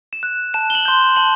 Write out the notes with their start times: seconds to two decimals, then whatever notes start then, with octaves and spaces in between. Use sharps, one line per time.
0.13 E7
0.23 F#6
0.54 A5 E7
0.70 G7
0.75 F#7
0.85 C6 G6
1.16 A5 F#7